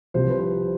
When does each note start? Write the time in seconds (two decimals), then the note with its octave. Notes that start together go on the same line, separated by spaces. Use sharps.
0.14 C2 C3 F3 C5
0.30 B4
0.40 C5